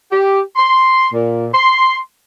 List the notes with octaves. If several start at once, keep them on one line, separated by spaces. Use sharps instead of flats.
G4
C6
A#2
C6